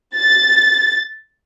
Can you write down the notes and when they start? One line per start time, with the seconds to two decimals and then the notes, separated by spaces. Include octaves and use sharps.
0.17 A6